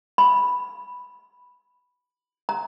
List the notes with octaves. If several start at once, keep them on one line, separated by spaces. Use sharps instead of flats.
B5
A#5